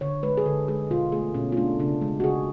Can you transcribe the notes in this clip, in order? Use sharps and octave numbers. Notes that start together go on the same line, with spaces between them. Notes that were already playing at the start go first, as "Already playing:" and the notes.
D3 C#5
G#3 B4
G#4
D3 A4
G#3 G#4
B2 F4
A3 G#4
B2 C#4
F4
A3 D4
C#3 D4
G#3
F#4
C#3 G#4